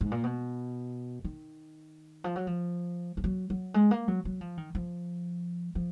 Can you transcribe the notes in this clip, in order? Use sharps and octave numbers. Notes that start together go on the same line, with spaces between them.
G#2
A#2
B2
D#3
F3
F#3
F3
F3
F#3
F#3
G#3
A#3
F#3
F#3
F3
D#3
F3
F3